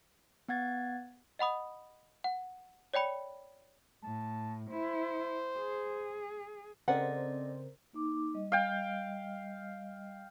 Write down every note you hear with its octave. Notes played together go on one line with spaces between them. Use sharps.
B3 F#5 G#6 A6
D#5 F#5 B5 D#6
F#5
C#5 D5 G5 B5 C#7
A2 A5
E4 C5
G#4
C#3 C4 A4 A#4 C5 D5 D#5 F#5
A#3 D#4 D6
G3 D#5
F5 G5